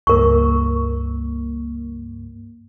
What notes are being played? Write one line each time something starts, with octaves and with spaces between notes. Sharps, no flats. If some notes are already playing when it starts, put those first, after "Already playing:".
C#2 G2 A#3 A#4 C#6